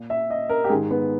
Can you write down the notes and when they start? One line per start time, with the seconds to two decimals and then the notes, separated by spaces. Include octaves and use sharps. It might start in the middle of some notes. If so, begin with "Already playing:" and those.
Already playing: A#2
0.10 E5
0.30 D#5
0.49 A#4
0.64 G4
0.70 G#2 D#3 G#4
0.91 B3